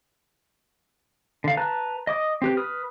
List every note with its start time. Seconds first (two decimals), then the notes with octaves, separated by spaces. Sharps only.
1.44 D3 F5
1.57 B4 A5 A#5 F#6
2.07 D#5 D6 D#6
2.42 C4 G4 B4
2.57 B4 D#6 F6